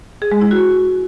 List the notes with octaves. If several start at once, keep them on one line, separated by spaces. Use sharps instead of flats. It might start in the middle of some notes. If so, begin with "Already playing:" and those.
G#4
G#3
E4
F#4